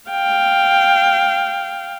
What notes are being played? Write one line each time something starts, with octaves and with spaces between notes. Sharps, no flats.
F5 G5